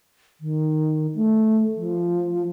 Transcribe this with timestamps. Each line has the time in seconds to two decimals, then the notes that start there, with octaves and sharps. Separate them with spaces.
0.41 D#3
1.15 A3
1.76 F3